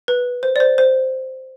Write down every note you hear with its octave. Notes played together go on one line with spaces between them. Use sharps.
B4
C5
D5
C5
C5